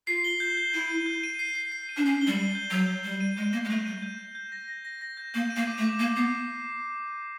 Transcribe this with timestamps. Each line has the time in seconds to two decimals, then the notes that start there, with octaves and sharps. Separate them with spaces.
0.07 F4 C7
0.24 G7
0.40 G6
0.57 G6
0.74 E4 D#7
0.89 D#7
1.06 G6
1.23 D#7
1.39 C7
1.55 C7
1.72 C7
1.89 D#7
1.97 D4
2.05 C#4 C7
2.21 G7
2.27 G3
2.38 D#7
2.55 G6
2.70 F#3 G6
2.87 G6
3.04 G3 G6
3.20 D#7
3.37 G#3 G6
3.53 A#3 A#6
3.64 G#3
3.69 A3 G6
3.85 G3 D#7
4.02 G6
4.19 G6
4.35 G6
4.52 A#6
4.68 A#6
4.85 A#6
5.01 A#6
5.17 G6
5.34 A#3 G6
5.50 D#7
5.56 A#3
5.67 D6
5.78 A3
5.83 D6
5.99 A#3 D6
6.16 B3 C7